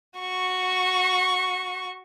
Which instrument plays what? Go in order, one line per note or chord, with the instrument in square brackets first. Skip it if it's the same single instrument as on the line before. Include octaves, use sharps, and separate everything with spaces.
[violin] F#4 C#6